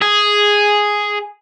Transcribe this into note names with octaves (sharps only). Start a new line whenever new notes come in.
G#4